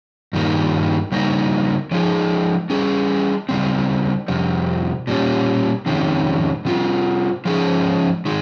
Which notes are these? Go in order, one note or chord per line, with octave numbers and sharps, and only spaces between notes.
G2 D#3 G3 A#3
C#3 G3 A#3 D#4
F3 G#3 D#4 G#4
G3 C#4 G#4
C#3 G3 C4
F2 C3 G3
A#2 G3 C#4
F2 C3 D#3 G#3 C#4
C3 G3 C4 F4
F3 G#3 C#4 G#4
D#3 G#3